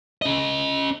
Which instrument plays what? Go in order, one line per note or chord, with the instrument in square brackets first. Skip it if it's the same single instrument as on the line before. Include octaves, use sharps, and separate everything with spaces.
[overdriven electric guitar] C#4 D#5